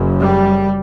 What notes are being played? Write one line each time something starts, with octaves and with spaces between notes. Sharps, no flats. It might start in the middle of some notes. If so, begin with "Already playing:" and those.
Already playing: F#1 F#2 C#3
G3